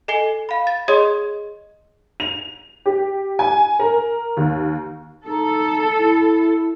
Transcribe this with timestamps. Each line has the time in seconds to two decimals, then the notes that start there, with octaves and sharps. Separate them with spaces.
0.08 A4 D#5 G#5 C7 G7
0.49 F5 B5
0.67 A6
0.88 G#4 C#5 D#5 C6 D#6 G#6
2.20 F7
2.86 G4
3.39 G#5
3.79 A#4
4.37 D#2
5.27 D#4 A4
5.97 E4